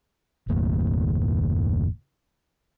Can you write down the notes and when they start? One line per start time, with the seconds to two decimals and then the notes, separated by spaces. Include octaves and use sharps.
0.48 F#1 D#2 A2